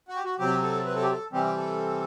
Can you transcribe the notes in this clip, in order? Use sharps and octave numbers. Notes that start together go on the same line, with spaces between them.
F#4
G4
F#4
C3 F#3 C4 G4
A4
B4
A4
G4
A4
C3 E3 G3 C4 G4
G4
A4